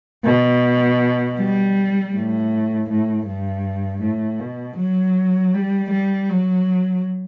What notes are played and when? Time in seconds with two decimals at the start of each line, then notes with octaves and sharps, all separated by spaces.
0.24 B2
1.38 G3
2.14 A2
2.90 A2
3.28 G2
4.02 A2
4.40 B2
4.77 F#3
5.54 G3
5.91 G3
6.30 F#3